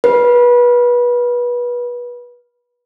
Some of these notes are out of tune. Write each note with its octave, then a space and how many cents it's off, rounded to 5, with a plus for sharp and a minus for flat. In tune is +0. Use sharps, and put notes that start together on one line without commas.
B4 -25